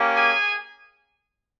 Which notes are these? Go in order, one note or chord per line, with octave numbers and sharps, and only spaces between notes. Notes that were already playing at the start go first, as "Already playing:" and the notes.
Already playing: A#3 C#4 G4
G#4 G#5